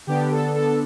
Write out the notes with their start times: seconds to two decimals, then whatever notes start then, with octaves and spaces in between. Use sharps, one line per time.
0.07 D3 B3 D4 G4
0.31 A4
0.55 A4